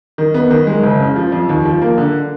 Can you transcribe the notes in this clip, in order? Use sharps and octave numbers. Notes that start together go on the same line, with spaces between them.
D#3
B3
D#3
G#3
F#1
C#3
F3
F2
D#2
F3
A#3
D3